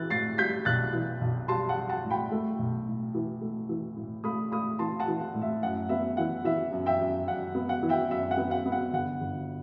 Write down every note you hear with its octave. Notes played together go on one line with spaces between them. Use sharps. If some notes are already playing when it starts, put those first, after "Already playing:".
Already playing: E3 F#6 A6
A2 A6 C7
G3 G6 B6
B1 F#6 A6
E3
B1
G3 A5 C6
F#5 A5
G3
F#5 A5
A2
G5 B5
A3
B1
A2
E3
A3
E3
A2
A3 B5 D#6
A3 B5 D#6
E3 A5 C6
F#5 A5
E3
F#5
A2
E5
F#2 F#5
B3 E5
E3 F#5
E3 E5
F#2
E5 G5
F#2
F#2 F#5
B3
F#5
E3
E5 G5
F#2 E5
F#5
B3
F#5
B3
F#5
G1 F#5
G1